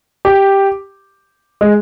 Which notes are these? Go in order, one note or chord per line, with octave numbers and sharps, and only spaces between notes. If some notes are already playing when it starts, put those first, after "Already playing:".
G4
G#3